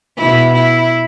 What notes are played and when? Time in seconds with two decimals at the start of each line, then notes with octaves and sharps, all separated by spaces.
0.17 B2 E4
0.54 E4